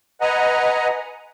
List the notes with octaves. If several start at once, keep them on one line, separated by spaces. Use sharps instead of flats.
B4 D#5 F#5 G#5 A#5